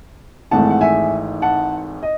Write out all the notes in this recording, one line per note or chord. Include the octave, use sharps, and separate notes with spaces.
G#1 G#2 E3 A3 F#5 A5
F#5
E5 G#5
F#5 A5
D#5